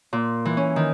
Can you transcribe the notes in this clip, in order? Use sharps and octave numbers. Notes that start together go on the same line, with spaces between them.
A#2
E3
C#4
D#3